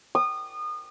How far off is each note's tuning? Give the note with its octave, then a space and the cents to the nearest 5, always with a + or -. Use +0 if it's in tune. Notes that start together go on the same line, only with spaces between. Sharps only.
D#6 -30